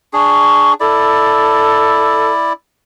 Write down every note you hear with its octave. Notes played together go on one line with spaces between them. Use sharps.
D4 G#4 C#6
E4 A4 D5